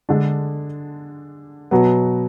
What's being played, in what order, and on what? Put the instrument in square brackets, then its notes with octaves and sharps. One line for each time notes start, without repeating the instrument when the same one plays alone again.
[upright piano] D3 G#3 D4
B2 F#3 B3